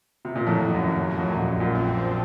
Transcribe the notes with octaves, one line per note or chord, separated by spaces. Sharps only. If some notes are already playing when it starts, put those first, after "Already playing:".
C3
A#2
F2 A2 F#3
D#2
F#2
D#2
F#3
F2
F#2 A#2
A#1
F#2 A#2
C4
F3